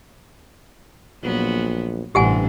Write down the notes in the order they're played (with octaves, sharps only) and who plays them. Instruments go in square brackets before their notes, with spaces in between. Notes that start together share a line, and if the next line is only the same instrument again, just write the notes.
[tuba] A#1 [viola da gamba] A#2 F#3 B3
[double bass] A1 [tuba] G2 [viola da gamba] C3 C4 D4 [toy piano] G4 F#5 G#5